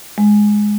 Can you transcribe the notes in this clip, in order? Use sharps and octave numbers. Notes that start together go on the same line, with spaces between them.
G#3